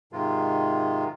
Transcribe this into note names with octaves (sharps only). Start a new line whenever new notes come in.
G#2 C3 D#3 G#3 F4